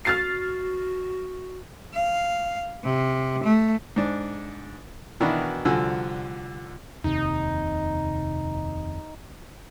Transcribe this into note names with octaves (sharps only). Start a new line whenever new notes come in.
F#4 F6 A6 C7
F5
C3
A3
G#2 D4
B2 D#3 E3 D4 E4 F#4
C2 D3 F3 F#4 G#5 E6
F1 D#2 C3 D#4